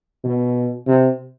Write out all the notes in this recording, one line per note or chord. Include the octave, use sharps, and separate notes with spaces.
B2
C3